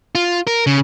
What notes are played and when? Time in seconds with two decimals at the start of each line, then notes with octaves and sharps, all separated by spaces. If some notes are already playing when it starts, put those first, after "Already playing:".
0.15 F4
0.47 A#4
0.67 C#3